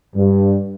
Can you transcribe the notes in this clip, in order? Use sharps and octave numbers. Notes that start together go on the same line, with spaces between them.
G2